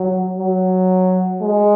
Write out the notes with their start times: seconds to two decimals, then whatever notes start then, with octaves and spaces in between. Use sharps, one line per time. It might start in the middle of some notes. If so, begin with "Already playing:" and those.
Already playing: F#3
0.38 F#3
1.42 G#3